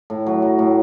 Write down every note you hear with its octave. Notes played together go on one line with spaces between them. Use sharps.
A2
F#3
F#3
A2